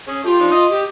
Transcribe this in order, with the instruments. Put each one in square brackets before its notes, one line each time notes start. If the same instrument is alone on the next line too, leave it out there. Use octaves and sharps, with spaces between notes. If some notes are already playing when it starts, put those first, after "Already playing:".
[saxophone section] C#4 G#4
[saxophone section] A3 G4 [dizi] F4
[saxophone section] F3 D4 D#4
D#5
[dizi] G4